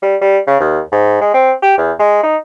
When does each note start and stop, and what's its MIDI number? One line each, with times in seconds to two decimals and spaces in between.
0.02 0.16 55
0.21 0.38 55
0.47 0.56 49
0.60 0.80 39
0.92 1.18 44
1.21 1.33 56
1.34 1.52 60
1.62 1.74 67
1.78 1.92 40
1.99 2.21 56
2.23 2.36 63